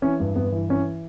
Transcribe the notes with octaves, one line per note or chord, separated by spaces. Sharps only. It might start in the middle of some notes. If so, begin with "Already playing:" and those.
E3 C#4
G2
G2 B3
E3
E3 C#4